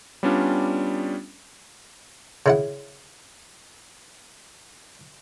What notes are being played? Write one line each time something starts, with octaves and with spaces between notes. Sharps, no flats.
G3 B3 C#4 D4 F4
C#3 E4 F#5